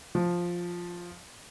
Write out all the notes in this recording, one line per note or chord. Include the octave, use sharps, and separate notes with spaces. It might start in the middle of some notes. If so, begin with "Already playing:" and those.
F3